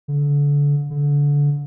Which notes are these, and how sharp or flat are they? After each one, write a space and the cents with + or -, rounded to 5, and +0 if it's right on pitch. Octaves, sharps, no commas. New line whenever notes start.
D3 -30
D3 -25